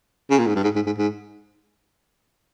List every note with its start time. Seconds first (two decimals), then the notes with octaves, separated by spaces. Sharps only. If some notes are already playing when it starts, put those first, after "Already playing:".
0.30 C#3
0.39 A#2
0.47 G#2
0.55 G2
0.64 G#2
0.75 G#2
0.86 G#2
0.97 G#2